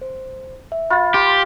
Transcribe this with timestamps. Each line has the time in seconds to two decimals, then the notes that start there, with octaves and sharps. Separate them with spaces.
0.01 C5
0.72 E5
0.90 F4 B5 A6
1.14 G4 C6